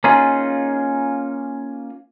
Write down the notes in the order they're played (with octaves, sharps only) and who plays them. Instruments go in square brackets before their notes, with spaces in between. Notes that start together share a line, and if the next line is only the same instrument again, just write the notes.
[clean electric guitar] A#3 C#4 D#4 F4 G#4